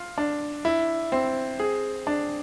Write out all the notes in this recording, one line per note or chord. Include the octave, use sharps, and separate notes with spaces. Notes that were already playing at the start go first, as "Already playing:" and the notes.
Already playing: F4
D4
E4
C4
G#4
D4